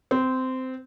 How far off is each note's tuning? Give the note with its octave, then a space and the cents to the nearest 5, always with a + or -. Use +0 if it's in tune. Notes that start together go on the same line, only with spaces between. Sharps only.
C4 -15